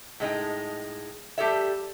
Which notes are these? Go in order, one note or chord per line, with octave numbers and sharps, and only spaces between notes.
A2 G#3 D#4 G5
G3 G4 A4 C#5 E5